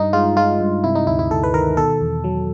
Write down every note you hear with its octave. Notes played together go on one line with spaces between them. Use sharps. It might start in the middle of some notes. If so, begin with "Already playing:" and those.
Already playing: G2 D#4
G#3 F4
G#3 F4
G2
C3 E4
D#4
D2 E4
E4
D2 A4
B4
D#3 A#4
B2 A4
E2
F#3